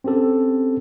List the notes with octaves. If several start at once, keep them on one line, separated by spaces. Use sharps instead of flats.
C4 C#4 G4 A4